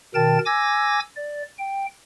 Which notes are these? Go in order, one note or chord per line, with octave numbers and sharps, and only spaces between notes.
B2 D#3 A#4 G5 A5 A6
G#5 D6 E6 G#6 A#6
D5
G5